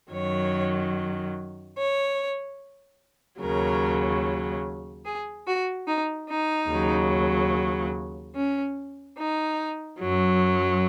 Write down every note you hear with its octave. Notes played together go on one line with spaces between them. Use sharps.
F#2 D#3 F#3 C#5
C#5
D#2 C#3 F#3 A#4
G#4
F#4
D#4
D#4
D#2 C#3 F#3
C#4
D#4
F#2 F#3